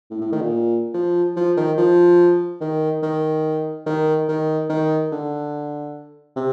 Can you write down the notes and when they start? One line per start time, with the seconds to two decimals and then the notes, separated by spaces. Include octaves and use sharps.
0.11 A2
0.21 A2
0.32 D#3
0.41 A#2
0.94 F3
1.36 F3
1.57 D#3
1.78 F3
2.61 D#3
3.03 D#3
3.86 D#3
4.29 D#3
4.69 D#3
5.12 D3
6.36 C3